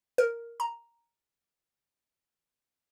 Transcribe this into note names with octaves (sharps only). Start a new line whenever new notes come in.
A#4
A#5